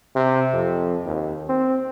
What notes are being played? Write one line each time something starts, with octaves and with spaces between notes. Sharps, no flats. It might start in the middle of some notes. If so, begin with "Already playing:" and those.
C3
F2
D#2
C4